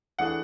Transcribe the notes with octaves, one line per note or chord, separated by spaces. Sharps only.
E3 A3 D4 G#4 F#5